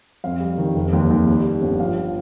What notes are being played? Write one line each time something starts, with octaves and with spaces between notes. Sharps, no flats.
F2 F5
G3
D#3
F1
D#2
D#2
G3
G3
G1
F3 F5
F3